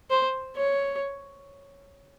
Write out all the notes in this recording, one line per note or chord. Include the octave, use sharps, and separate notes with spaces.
C5
C#5